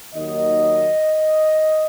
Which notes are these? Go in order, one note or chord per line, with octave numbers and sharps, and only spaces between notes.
D#2 D#3 F#3 A#3 D#5